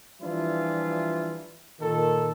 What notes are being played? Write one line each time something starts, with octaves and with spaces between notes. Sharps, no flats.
E3 F3 G3 D4 E4 F4
A#2 D#3 A4